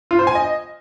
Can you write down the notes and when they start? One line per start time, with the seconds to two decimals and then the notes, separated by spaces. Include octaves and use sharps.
0.11 F4
0.19 C5
0.27 G#5
0.35 D#5